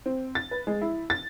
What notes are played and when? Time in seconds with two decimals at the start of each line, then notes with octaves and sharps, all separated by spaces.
0.06 C4
0.35 A6
0.51 B4
0.67 G#3
0.81 E4
1.10 A6